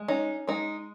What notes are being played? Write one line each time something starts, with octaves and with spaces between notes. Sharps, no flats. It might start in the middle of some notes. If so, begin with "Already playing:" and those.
Already playing: G#3
C#4 D#4
G#3 D#4